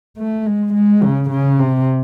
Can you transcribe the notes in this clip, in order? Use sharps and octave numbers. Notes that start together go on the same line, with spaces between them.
A3
G#3
G#3
C#3
C#3
C3